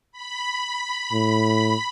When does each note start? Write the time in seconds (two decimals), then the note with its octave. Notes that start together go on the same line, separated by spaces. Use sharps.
0.12 B5
1.13 A2